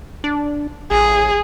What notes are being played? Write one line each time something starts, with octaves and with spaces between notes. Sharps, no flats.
D4
A1 G#4